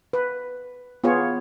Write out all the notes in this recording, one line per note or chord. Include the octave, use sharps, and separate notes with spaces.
B4
B3 F4 G#4 C#5